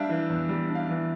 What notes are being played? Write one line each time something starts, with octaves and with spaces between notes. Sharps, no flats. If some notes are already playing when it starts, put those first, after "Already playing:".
Already playing: G3 D4 E5 F5
E3
E2
G3
D4
F5
E3